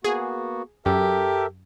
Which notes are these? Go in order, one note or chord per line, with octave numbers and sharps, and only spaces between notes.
A#3 B3 F#4 G#4
F#2 G4 A4 A#4 E5